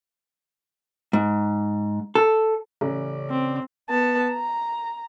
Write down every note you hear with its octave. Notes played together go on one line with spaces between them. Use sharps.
G#2
A4
A1 C#3 C#4 D5
C4
B3 A5
A#5